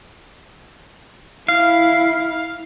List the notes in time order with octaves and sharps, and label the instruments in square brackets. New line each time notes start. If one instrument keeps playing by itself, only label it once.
[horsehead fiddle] E4 [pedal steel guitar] F5